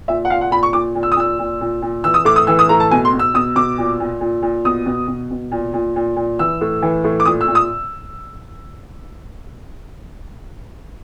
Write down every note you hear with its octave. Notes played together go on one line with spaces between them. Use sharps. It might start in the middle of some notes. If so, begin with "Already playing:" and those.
A#2 E5
F#5
A#2 F5
F#5
A#2 B5
C#6
A#2 D6
A#2
E6
D#6
A#2 E6
A#2
A#2
A#2
E3 E6
D#6
A2 D6
D#6
E3 E6
D#6
A2 A#5
A5
B2 G#5
C6
B2
E6
B2 D#6
B2 D6
A#2
A#2
A#2
A#2
B2 D#6
B2
B2
B2
A#2
A#2
A#2
A#2
E3 E6
A2
E3
A2
D6
A#2 D#6
E6
A#2
D#6